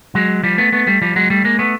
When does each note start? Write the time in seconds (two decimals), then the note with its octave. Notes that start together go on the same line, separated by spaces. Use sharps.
0.15 F#3 G#3
0.43 F3 G3
0.58 A3 B3
0.72 A3 B3
0.87 G3 A3
1.02 F3 G3
1.16 F#3 G#3
1.30 G3 A3
1.44 G#3 A#3
1.59 A3 B3